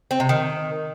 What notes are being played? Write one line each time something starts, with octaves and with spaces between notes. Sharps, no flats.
C4
C3
D#3